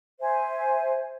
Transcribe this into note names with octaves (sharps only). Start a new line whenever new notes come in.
C5 E5 G#5